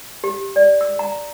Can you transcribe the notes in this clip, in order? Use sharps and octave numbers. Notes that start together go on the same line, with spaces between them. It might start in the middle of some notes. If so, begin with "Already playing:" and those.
G4
D5
E6
A#5